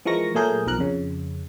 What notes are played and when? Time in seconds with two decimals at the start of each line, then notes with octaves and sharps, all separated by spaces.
0.05 E3 F3 G#3 A#4 C#6 A#6
0.35 A#2 F#3 A3 G#4 A#4 G6
0.66 B1 F3 A#4 F#6
0.78 F2 C#3